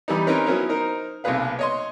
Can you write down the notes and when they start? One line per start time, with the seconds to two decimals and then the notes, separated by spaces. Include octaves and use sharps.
0.08 E3 G3 B3 D#4
0.27 C4 C#4 D#4 A#4 B4
0.46 F#3 B3 C#4 D#4 E4 A#4
0.69 D#4 A#4 C5
1.24 B1 C3 A#3 G#4 B4 F5
1.59 C#5 D#5 C6